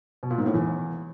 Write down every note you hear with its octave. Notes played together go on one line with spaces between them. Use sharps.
B2
A#2
G#2
A2
E2